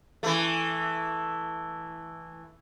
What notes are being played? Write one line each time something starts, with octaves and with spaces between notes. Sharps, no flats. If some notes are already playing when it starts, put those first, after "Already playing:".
E3 A3